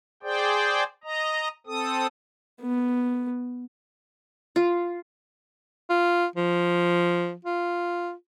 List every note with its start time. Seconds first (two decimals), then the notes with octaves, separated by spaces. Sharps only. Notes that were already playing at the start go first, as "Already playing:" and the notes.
0.23 G#4 C5 D5 G5
1.04 D#5 A#5
1.67 C4 A4 D#6
2.61 B3
4.56 F4
5.90 F4
6.36 F3
7.45 F4